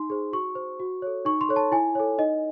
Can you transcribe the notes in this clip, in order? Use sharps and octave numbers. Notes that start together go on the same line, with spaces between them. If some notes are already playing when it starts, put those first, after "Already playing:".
Already playing: D#4 C6
G#4 C5
F#4 C#6
C5
F#4
A4 C#5
D#4 C#6
C6
A4 C#5
A5
E4 G#5
A4 C#5
D#4 D#5